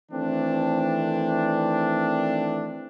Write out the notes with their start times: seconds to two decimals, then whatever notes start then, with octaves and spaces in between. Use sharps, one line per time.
0.12 D#3 E3 A3 C4 D4